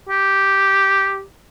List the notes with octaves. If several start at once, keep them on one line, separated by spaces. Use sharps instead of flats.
G4